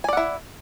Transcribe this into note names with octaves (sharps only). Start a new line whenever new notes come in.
E4 D5 F#5 G#5